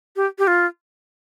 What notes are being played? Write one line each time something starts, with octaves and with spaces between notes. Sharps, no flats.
G4
G4
F4